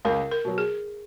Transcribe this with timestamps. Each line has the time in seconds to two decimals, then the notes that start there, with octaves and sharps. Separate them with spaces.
0.05 C#2 A#4
0.31 A#4
0.45 B2 F#3
0.58 G#4